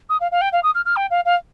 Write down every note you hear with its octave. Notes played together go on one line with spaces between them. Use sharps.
D#6
F5
F5
G5
F5
D#6
F6
F6
G5
F5
F5